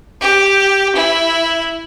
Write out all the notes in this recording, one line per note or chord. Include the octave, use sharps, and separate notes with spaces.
G4
E4